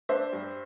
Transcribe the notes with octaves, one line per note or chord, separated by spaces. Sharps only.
D4 C5 E5
G2